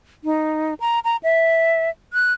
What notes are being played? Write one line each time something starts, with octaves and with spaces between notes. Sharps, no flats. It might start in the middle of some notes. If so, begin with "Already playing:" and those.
D#4
A#5
A#5
E5
F#6